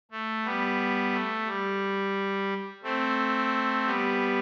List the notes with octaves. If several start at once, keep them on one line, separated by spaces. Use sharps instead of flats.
A3
G3 B3
A3
G3
A3 C4
G3 B3